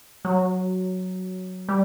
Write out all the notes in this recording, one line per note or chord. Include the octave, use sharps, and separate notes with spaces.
F#3
G3